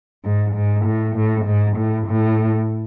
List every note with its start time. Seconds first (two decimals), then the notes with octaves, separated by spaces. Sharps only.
0.25 G#2
0.55 G#2
0.85 A2
1.16 A2
1.46 G#2
1.77 A2
2.07 A2